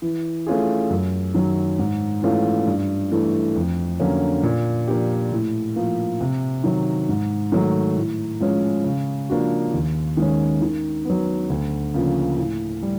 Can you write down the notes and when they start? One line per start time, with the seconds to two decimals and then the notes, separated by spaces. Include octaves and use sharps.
0.02 E3
0.47 A3 C#4 F4 G#4
0.90 F#2
1.34 D#3 F#3
1.79 G#2
2.23 E3 A3 C#4 F4
2.67 G2
3.12 E3 A3
3.55 F2
4.00 D3 F#3 A#3 C#4
4.43 A#2
4.87 F3 A#3 D4 G4
5.32 A2
5.76 F3 A#3
6.21 C3
6.64 D#3 F#3
7.09 G#2
7.52 D#3 F#3 A3
7.97 A2
8.40 F3 G#3 C#4
8.84 C#3
9.29 F3 A#3 D4 F#4
9.74 D#2
10.17 D#3 G#3 C#4
10.62 D#3
11.05 F#3 B3
11.50 D2
11.94 C#3 F3 A#3
12.38 A2
12.83 G3